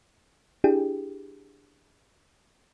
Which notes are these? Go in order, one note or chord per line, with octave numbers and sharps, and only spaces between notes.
D4 E4 G4 G#4 G5